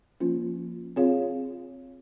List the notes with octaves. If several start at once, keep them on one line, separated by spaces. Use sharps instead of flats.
F3 A#3 C#4 F4
C4 F4 G#4 C#5 F5